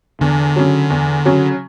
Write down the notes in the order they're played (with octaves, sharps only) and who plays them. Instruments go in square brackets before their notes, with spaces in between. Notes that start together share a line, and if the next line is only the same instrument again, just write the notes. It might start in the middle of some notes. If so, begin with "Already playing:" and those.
[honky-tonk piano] E2 [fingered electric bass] D3
[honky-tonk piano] C#3 F#3
E2
C#3 F#3